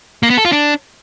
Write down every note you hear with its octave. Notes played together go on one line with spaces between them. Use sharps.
A#3
B3
A4
F4
D4